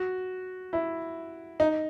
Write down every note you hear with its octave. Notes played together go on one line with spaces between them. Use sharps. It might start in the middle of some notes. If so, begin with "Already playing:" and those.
Already playing: F#4
E4
D#4